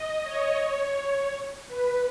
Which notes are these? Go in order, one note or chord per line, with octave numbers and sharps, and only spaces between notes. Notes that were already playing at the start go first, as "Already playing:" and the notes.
Already playing: D#5
C#5
B4